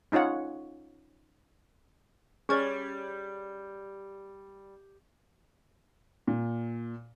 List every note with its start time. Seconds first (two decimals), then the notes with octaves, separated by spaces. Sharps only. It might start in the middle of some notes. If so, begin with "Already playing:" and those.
0.12 C#4 D#4 F4 C#5 F#5
2.49 G3 C#4 G#4 C#5 C#6 F6 G#6 A6
6.27 A#2